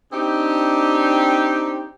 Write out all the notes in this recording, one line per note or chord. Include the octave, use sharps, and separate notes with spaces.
C4 D4 D#4 G4